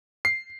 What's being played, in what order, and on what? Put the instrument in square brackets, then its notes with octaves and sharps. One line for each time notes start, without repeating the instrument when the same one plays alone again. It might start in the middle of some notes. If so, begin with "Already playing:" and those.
[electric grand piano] C7